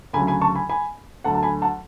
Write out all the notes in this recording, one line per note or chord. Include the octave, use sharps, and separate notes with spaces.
D2 C#3 F#3 G#5 B5
G#5 B5
A5 C#6
G#5 B5
G#5 B5
D2 D3 F#3 F#5 A5
A5
G#5 B5
F#5 A5